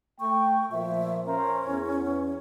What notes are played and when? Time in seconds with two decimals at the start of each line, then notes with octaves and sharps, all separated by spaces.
0.20 A3 G5 C#6
0.72 A#2 F3 E5
1.26 C#4 A#4 C5
1.65 E2